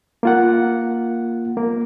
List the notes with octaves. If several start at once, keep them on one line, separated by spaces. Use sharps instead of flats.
A#3 F4 F#5
A#3